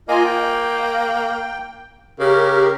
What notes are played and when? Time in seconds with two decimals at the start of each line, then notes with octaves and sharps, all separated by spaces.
0.09 A#3 F4 D#5 G#5
0.25 G5
2.20 C#3 G4 A#4